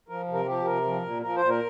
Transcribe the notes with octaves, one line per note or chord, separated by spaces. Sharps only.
F3 A#4
C3
A#4
F3 G4
C3 A#4
F3
A#2
F3 A#4
C5
A#2
A#4